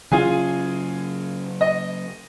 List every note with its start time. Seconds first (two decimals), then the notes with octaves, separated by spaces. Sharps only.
0.12 C#3 F#3 C#4 F4 G#4 G#5
1.61 D#5